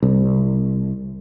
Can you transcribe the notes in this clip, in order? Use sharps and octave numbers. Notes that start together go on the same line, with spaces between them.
C2